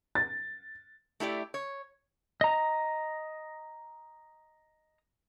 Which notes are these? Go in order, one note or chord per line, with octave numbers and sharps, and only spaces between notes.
A6
A3 E4 G4 D5
C#5
D#5 A#5